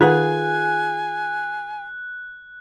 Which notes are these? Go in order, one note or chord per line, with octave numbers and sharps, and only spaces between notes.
D#3 D#4 F4 G#4 B4 F#5 G#5 F#6